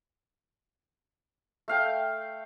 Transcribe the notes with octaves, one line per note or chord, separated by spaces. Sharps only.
A3 F5 G5